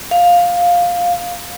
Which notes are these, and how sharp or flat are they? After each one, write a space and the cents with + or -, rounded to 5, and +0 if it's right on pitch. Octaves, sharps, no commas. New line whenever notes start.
F5 +10